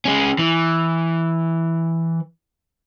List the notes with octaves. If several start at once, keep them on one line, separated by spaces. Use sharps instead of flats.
G#3 C#4
E3